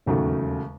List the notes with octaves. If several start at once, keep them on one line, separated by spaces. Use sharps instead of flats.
E1 D#2 C#3 F#3 A3